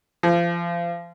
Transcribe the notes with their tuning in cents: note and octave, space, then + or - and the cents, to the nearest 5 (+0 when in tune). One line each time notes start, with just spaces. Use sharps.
F3 -30